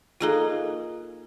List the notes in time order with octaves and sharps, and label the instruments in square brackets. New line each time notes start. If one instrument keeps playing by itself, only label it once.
[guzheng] A#3 D#4 G#5 [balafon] F4 G#4 A4